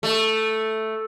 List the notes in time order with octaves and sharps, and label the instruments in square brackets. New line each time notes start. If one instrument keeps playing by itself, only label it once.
[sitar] A3